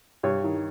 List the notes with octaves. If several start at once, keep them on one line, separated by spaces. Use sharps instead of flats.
G2 C#5
D#3